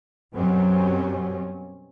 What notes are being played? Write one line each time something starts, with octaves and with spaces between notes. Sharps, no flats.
F#2 B2 F#3 G3 C4 C#4